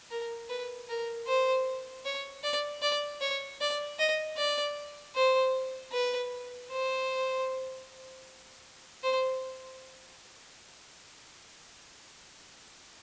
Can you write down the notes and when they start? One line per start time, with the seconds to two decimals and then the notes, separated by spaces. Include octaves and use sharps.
0.10 A#4
0.49 B4
0.89 A#4
1.27 C5
2.05 C#5
2.44 D5
2.82 D5
3.21 C#5
3.61 D5
3.99 D#5
4.37 D5
5.15 C5
5.93 B4
6.71 C5
9.03 C5